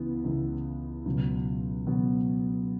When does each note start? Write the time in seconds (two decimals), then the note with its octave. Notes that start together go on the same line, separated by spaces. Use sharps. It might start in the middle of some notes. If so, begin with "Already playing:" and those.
Already playing: C#2 C#3 E3 B3 E4
0.24 C#2 C#3 E3 B3 E4
1.05 C#2 B2 F#3 B3
1.87 C#2 B2 F#3 B3